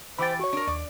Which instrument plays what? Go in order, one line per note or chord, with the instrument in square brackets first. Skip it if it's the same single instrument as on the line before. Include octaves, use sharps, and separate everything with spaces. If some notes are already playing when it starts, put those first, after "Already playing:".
[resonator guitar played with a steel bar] E3 G4 G5 [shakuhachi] C5 [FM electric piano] B5 D6 A6
[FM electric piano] F#4 C#5 [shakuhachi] C#6
[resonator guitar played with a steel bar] D4 A#4
[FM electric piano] D#2 [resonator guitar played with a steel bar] D5